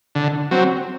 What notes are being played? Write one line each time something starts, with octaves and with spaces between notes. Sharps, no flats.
D3
F#3 C4